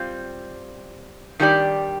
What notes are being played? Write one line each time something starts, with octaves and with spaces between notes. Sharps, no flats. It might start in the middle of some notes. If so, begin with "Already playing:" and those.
Already playing: G3 C4 F4
D#3 G3 D4 G4 D5